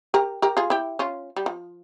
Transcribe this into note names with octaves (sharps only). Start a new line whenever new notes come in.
G4 A#4
G4 A#4
F4 G#4
E4 G4
C#4 F4
G3
F3